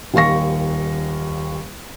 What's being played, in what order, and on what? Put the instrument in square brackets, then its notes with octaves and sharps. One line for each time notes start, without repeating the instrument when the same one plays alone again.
[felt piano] D#1 D#2 F5 C#6 A#6